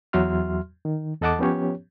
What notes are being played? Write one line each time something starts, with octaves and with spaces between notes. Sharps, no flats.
E2 F#3 F#4 E5 C6 F6
D#3
E2 A4 D#5 F#5 A5 D6
F3 B3 C#4 G4 C#5